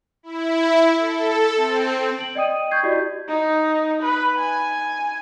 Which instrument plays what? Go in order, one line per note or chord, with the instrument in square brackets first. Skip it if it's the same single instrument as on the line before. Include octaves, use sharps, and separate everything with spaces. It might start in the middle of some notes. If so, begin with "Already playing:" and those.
[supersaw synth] E4
A4
C4
[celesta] D7 F#7
D5 D#5 G5 D#6 D#7
C#6 G6 G#6 C7
E4 F#4 G4 D5 D#5
[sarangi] D#4
B4
G#5